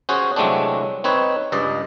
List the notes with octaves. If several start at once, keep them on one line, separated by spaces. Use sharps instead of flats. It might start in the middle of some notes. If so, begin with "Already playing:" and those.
C#4 F#4 G#4 C5
C2 F#3 G#3 A3 C4 D4
C4 D#4 B4 C#5
C#2 G2 D5 D#5